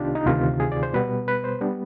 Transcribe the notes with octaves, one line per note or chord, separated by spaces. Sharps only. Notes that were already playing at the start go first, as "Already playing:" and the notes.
Already playing: C2 C3 D#3 B3 D4 D#4 F4 G4
D#4
D2 C3 D#3 F4
G#4
D5
C5
B2 G3 B3 B4
B4
C5
G3 B3 D4